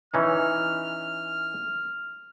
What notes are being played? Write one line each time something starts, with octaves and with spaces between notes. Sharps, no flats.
E3 C#4 D#4 F6